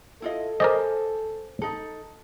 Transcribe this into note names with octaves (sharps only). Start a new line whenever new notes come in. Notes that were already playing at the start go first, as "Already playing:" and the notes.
E4 F4 A4 D#5
A#4 C5 D5 D#5 G#5
D#4 A4